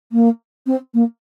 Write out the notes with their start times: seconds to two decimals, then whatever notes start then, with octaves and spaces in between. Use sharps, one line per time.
0.12 A#3
0.67 C4
0.94 A#3